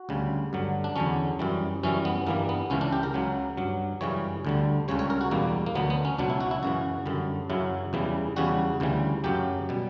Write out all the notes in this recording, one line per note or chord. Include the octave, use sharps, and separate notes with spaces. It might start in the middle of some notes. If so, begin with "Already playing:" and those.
Already playing: F#4
D2 C#3 G3
G2 D3 F#3
D4
E2 D3 F#3 C#4
F#2 E3 G3
F#2 E3 G3 C#4
B3
G2 E3 G3 A#3
B3
C#2 C#3 E3 C#4
D4
G4
A#4
C#2 C#3 F#3
G2 F#3
F#2 C#3 E3 G3 C#5
D2 D3 G3
C#2 C#3 G3 C#5
C#5
A#4
F#4
E2 B2 G3 A#3
A#3
D2 D3 F#3 B3
B3
C#4
C#2 B2 F#3 D4
E4
F#4
E4
F#2 C#3 E3 F#4
F#2 D3 G3
F#2 C#3 F#3 E4
E2 C#3 E3 G3
E2 C#3 G3 F#4
D2 C#3 E3 G3
F#2 C#3 F#3 G4
B2 G3